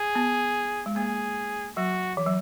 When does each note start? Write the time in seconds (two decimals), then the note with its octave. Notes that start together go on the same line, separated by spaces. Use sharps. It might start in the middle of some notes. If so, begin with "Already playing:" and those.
Already playing: G#4
0.15 B3
0.86 G#3
0.96 A#3 G#4
1.77 F#3 F#4
2.17 E3
2.26 F#3